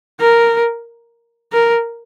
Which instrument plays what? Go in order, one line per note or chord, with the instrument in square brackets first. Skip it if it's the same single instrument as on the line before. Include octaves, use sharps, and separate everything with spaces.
[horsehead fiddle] A#4
A#4